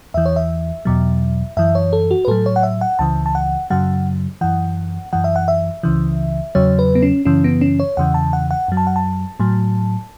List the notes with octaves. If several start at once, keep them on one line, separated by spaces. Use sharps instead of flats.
E2 E3 E5
C#5
E5
E2 B2 F#3
F#2 E3 E5
C#5
A4
F#4
B4
A2 F#3 A4
C#5
F#5
E5
F#5
C#2 C#3 E3 A5
A5
F#5
F#2 C#3 F#3 F#5
F#2 E3 F#5
F#2 E3 F#5
E5
F#5
E5
C#2 C#3 E3
E2 C#3 F#3 C#5
B4
B3
C#4
F#2 C#3 E3 C#4
B3
C#4
C#5
E2 C#3 E3 F#5
A5
F#5
F#5
F#2 F#3
A5
F#5
A5
A2 F#3